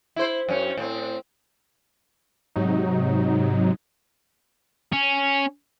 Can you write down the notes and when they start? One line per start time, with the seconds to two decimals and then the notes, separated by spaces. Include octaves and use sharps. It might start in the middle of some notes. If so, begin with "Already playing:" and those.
0.16 E4 C5
0.49 F#2 C#4
0.77 A2 C4
2.56 G#2 C3 F#3 D#4
4.93 C#4